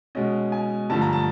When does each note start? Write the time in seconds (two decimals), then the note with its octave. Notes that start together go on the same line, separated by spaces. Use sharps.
0.15 B2 G#3 C#4 D#5
0.52 G#5
0.90 G2 D3 F3 A3 A5
1.02 A#5
1.13 A5